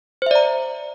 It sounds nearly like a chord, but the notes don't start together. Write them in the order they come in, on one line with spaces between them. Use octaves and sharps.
C5 E5 D5 A#5